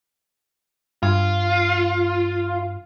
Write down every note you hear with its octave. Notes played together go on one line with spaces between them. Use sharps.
G2 F4